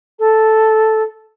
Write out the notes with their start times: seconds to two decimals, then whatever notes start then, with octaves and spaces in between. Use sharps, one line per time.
0.19 A4